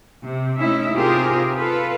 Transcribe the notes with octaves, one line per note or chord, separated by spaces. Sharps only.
C3
A3 C#4 D#4 E4 E5
C3 C4 F4 G4 G#4 A#4
F4 A4 B4